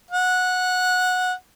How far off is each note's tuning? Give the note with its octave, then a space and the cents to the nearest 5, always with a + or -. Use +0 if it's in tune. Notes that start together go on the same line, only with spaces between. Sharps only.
F#5 -15